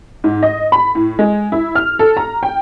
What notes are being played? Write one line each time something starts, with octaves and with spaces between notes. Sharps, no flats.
G#2
D#5
B5
A2
G#3
E4
F6
A4
A#5
G5